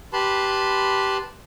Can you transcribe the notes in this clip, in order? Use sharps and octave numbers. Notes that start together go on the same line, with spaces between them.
G4 B4 A5 B5 C6